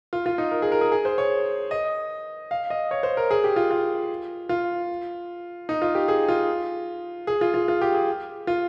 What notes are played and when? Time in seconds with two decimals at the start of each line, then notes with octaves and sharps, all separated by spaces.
0.13 F4
0.26 F4
0.38 D#4
0.51 A#4
0.62 G#4
0.72 A#4
0.81 G#4
0.92 G#4
1.05 C5
1.18 C#5
1.71 D#5
2.51 F5
2.70 D#5
2.91 C#5
3.03 C5
3.17 A#4
3.31 G#4
3.44 G4
3.56 F4
3.71 F4
4.49 F4
5.69 D#4
5.82 F4
5.95 G4
6.08 G#4
6.29 F4
7.27 G#4
7.41 F4
7.54 F4
7.68 F4
7.81 G4
7.94 G#4
8.47 F4